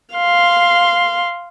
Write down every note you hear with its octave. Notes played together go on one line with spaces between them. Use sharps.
F5 C6